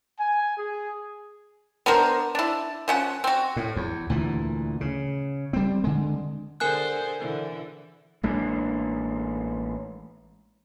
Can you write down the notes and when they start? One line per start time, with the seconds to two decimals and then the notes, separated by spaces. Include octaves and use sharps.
0.20 G#5
0.58 G#4
1.86 B3 D4 A#4 C5
2.35 D4 E4
2.88 F3 C#4 F#5
3.24 C4 F#4
3.57 A2
3.76 E2
4.10 D2 A#2 E3
4.81 C#3
5.53 G3 C4
5.84 D3 G#3
6.60 D3 G#4 A#4 C5 G#5 F#6
7.19 D3 E3
8.23 A1 G#3 A#3 D4